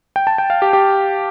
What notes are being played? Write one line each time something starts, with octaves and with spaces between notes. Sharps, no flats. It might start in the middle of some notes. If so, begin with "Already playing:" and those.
G5
A5
G5
F5
G4
G4